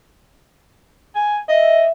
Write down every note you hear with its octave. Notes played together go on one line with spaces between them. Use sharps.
G#5
D#5 E5